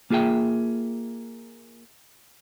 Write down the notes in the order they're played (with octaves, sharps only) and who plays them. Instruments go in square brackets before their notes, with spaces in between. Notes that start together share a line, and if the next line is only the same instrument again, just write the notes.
[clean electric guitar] A#3 F4 G#4 E5 G5